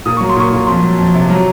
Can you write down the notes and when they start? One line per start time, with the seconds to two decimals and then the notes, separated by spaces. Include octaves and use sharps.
0.06 A#2 D#6
0.17 F#3 C#6
0.29 C6
0.36 A#2 C#6
0.52 A#2
0.67 F2 C6
0.82 F#3
0.98 F2
1.14 C3
1.29 F#3